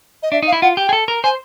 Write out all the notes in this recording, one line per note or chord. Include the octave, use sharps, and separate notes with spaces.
D#5
D4 E5
D#4
F5
E4
F4 F#5
G4 G5
G#4
A4
A#4
C5 G#5